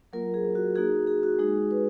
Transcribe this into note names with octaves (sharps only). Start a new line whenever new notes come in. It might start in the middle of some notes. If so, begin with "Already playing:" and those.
F#3 A#3 F4 A#4
G#4
F#4
A#3 D#4 F#4 G#4
G#4
F#4
G#3 D#4 F#4 G#4
B4